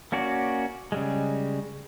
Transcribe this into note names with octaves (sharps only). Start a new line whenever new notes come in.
A#3 C#4 F#4 D5
C#3 G3 G#3